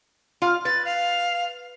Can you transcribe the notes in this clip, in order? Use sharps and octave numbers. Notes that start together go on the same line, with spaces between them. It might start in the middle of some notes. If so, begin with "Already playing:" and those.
F4 F5
B4 A6
F5